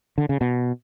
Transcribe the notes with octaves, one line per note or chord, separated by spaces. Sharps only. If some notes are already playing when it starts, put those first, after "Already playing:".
D3
C#3
B2